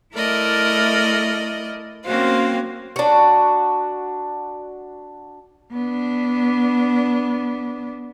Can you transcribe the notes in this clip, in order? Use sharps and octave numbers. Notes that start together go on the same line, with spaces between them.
A3 E4 A#4 D5 D#5
A#3 C4 C#4 F#4 C5 F5
D4 F#4
B3 D4